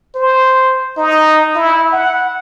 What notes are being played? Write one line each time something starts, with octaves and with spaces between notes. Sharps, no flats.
C5
D#4
E4
F#5